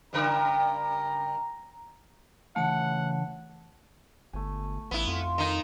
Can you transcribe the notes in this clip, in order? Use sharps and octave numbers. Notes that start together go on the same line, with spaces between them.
G2 C#3 A#4 A#5
C#3 E3 A3 F#5 A5
G1 A3 G#5
A1 B3 E4
F2 F4 G#5 C6
D#3 D#4